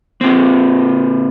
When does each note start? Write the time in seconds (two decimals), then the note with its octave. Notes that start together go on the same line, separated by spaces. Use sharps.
0.21 A#2 C4